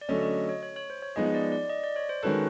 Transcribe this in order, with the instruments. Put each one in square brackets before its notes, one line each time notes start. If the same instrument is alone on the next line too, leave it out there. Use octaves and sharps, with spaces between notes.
[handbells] D5
[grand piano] D3 F#3 A3 C#4 [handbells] D#5
[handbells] D#5
C#5
C#5
C#5
C5
C#5
[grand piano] F3 G#3 B3 D#4 G#4 [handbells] D#5
[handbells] D5
D5
D#5
D5
C#5
C5
[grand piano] D#3 G#3 C#4 F#4 A4 [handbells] B4